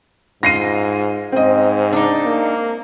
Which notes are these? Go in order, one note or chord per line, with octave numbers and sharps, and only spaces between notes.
G#2 F4 A#6 C7 D#7
G#2 C4 D#5
D4 D#4
A#3